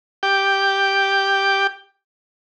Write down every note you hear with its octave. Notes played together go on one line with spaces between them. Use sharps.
G4 G5 D6